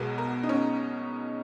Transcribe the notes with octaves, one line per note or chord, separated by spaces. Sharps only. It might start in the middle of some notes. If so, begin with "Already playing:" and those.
Already playing: B1 B2 G#3 B3 A#4
A#4
D#4
C#4